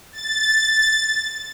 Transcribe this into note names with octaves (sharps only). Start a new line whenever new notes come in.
A6